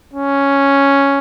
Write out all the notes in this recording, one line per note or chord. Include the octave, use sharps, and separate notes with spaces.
C#4